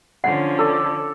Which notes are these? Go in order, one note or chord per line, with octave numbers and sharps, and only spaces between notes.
D3 F3 C#4 F#5
A4 D5